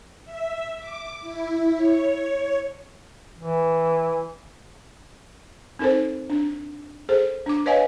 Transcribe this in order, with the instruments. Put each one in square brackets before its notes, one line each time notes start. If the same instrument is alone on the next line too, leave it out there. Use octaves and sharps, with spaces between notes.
[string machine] E5
D6
E4
C#5
[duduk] E3
[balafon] C4 D#4 A4 A#4 C5
D4
G#4 A4 C5
D4 D6
B4 C#5 D#5 F5 G#5